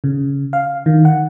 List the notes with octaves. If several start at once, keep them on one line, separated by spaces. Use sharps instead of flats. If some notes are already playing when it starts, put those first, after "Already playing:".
C#3
F5
D#3
F#5